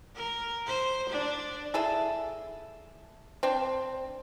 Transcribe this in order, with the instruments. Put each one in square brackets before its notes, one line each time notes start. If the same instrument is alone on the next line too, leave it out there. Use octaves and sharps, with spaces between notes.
[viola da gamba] A#4
C5
D4
[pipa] E4 G#4 A4
C4 D4